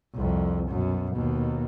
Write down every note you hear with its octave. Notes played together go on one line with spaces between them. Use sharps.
C2 F2
F#2 B2
D#2 B2